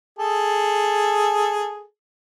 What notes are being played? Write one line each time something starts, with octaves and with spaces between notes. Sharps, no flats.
G#4 A4